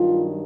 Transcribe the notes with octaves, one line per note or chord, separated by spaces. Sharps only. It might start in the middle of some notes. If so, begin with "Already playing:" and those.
Already playing: G2 D#3 F#3 F4